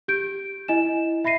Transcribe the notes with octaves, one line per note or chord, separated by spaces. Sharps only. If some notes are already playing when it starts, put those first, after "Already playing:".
G4 G6 D7
E4 D#5 G#5 E7
E5 B5 A#6 C7 D#7